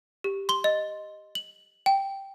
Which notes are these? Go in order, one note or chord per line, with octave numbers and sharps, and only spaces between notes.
G4
C6 G7
D#5
F#7
G5